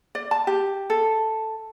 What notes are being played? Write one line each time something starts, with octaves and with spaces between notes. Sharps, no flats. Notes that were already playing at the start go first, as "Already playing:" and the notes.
D5
A5
G4
A4